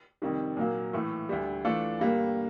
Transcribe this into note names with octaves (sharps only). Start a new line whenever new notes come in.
F2 C3 D#3 G3
A#2 F#3 A#3
A2 E3 A3
D2 D3 G3
E3 A3 D4 F4 A4
G2 D3 G3 A#3